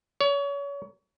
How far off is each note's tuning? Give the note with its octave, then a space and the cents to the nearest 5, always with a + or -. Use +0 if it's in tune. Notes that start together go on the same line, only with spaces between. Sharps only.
C#5 +30